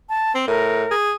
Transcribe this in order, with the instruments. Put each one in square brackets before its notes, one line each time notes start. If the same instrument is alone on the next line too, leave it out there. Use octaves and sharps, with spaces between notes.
[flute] A5
[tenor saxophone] C4
[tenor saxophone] A2 [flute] A#4
[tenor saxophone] G#4